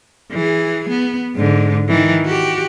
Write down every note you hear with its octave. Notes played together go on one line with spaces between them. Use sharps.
E3 G#4
B3
G#2 D3
D#3 E3
F#4 G4